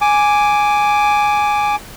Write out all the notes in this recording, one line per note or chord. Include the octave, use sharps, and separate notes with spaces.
G#5 D6